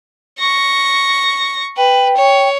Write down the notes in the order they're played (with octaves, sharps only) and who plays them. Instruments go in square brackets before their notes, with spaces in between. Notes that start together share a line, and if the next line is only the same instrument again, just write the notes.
[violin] C#6 A#6
[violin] B4 [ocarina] G5
[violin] C#5